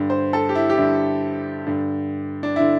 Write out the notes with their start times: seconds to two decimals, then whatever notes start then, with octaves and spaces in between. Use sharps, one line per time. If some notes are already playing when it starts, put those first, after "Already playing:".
Already playing: G2 D3
0.10 C5
0.33 A4
0.49 G4
0.55 E4
0.70 G4
0.77 G2 D3 E4
1.66 G2 D3
2.43 D4
2.56 D3 E4